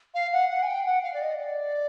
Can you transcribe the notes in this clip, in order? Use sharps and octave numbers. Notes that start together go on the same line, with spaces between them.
F5
F#5
F#5
G#5
G5
F#5
F5
D5
D#5
D5